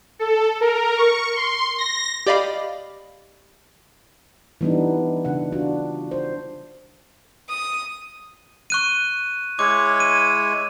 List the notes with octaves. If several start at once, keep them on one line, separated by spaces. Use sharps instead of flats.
A4
A#4
C#6
C6
A#6
G4 D5 D#5 F5 B5
E3 G3 B3 D4 D#4
C#3 D4 F#5
D4 F4 F#4
C5
D#6
C#6 F#6 D#7
G#3 E4 C#5 D6
D#7